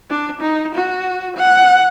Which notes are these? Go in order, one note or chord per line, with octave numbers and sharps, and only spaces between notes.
D4
D#4
F#4
F#5